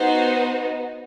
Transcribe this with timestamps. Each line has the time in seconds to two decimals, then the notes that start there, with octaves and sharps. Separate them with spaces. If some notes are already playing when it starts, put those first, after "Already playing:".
Already playing: B3 D#4 F#4 C5